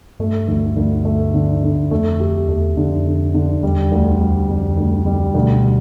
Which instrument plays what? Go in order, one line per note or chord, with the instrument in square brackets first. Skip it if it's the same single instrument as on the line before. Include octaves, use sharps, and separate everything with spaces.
[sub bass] G2 [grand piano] A3
[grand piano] D2
D2
A3
D3
D3
[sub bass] F2 [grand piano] A3
[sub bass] F2 [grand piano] G4
[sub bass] E2 [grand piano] A3
[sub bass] F2 [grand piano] D3
[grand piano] D3
D3
[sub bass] E2 [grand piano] G3
[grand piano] D2
G3
[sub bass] F2 [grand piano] G3
[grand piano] D2
G3
[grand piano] D2 [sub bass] B2
[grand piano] G3